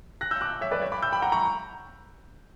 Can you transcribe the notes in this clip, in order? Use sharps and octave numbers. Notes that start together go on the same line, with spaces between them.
F#6 A#6
E6 G6
D6 F#6
C#5 E5
B4 D5
C#5 E5
B5 D6
E6 G6
G5 B5
F#5 A#5
A#5 C#6